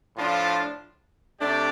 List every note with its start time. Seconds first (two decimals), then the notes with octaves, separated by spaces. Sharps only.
0.17 A2 F3 D4 F4
1.40 C3 A3 D4 G4 D5